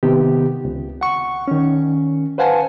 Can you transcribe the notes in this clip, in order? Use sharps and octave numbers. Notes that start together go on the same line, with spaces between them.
C3 D#3 B3 G4
C#2
F#5 C#6
D#3 C#4
B4 C5 F5 F#5 G#5 A5